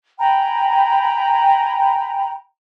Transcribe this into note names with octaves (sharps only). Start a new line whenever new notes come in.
G5 G#5 A#5 B5